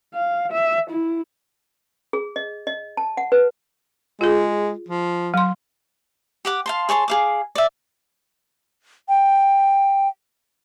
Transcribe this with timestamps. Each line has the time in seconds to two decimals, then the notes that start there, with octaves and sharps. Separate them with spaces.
0.14 F5
0.52 E5
0.90 E4
2.13 G#4
2.36 D#5
2.67 D#5
2.97 A5
3.17 F#5
3.32 B4
4.21 G#3 F4 G#4
4.89 F3
5.34 F#3 C6
6.45 G4 F#5 D6
6.66 F5 A5 C6
6.89 G#4 C#5 A5 C6
7.08 G#4 F5 D6
7.55 D5 E5
9.09 G5